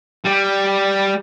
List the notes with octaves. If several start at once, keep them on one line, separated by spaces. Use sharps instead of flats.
G3